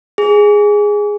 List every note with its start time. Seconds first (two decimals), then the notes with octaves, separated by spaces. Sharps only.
0.18 G#4